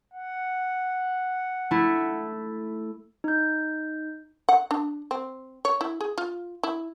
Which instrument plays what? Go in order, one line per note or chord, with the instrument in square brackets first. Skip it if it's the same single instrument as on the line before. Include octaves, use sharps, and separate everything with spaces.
[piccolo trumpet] F#5
[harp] A3 E4
[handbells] D#4 G6
[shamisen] F#5
D4
C4
C#5
E4
G#4
F4
E4